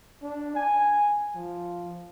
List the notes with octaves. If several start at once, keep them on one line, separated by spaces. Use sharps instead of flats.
D4
G#5
F3